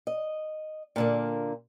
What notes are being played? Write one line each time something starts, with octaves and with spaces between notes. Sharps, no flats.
D#5
A#2 D3 A#3